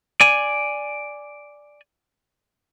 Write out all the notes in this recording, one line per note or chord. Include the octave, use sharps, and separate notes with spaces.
D5 G#5